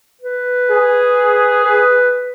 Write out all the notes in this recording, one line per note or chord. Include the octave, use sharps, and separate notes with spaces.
B4
G#4
B4